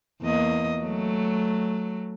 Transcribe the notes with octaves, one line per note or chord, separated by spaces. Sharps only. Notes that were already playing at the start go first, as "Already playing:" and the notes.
E2 A#3 D#5
F#3 A3